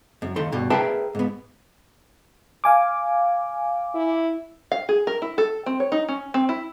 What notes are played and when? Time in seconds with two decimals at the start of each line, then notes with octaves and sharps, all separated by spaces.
0.22 F#2
0.36 D#2 D#4 A4 C6
0.52 G2 B2
0.70 G#4 A#4 B4 E5 G5 A5
1.15 G#2 B3
2.64 F5 G#5 D6
3.95 E4
4.72 F5
4.89 G#4
5.07 A#4
5.22 E4
5.38 A4
5.66 C4
5.80 C#5
5.92 D#4
6.08 C#4
6.34 C4
6.49 E4